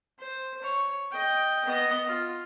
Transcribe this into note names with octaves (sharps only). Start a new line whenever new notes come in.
C5
C#5
D#5 G5
B3 D#5
F4